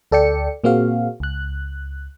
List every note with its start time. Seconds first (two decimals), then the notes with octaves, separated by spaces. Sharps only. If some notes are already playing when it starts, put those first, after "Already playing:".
0.12 D2 A4 D5 G5 C#7
0.64 A#2 A#3 C4 F#4 G#4 F5
1.20 C#2 F#6